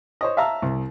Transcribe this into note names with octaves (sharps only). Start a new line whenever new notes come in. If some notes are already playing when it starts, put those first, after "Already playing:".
C5 C#5 D#5
E5 F5 A5 A#5 E6
C2